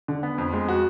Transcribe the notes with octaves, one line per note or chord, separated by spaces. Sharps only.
D3
B3
F2
G#3
F#4